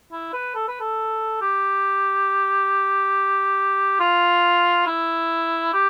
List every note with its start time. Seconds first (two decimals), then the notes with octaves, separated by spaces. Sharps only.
0.12 E4
0.33 B4
0.55 A4
0.68 B4
0.80 A4
1.41 G4
4.00 F4
4.86 E4
5.73 G4